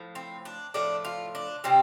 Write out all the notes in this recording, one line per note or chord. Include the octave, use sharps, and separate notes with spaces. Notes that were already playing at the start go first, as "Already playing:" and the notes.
Already playing: A2 F3
C4
D4
A2 F3 A3 D4
F4
D4
C3 G3 C4